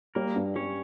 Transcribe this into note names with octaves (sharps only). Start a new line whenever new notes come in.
G3 A#3 A#4
G2
G3 C#4 C#5